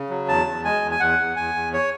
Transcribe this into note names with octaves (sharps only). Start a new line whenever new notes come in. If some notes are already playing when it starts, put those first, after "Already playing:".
Already playing: C#3
F#3
E2 A5
E2
G#3 G#5
E2
G#5
E2 F#5
E2
E2 G#5
E2
C#5